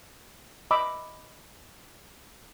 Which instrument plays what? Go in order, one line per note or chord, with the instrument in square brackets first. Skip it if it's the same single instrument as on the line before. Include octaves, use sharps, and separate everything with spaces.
[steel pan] D#5 B5 D6 E6